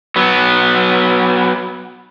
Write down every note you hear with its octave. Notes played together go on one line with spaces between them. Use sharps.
F#3 B3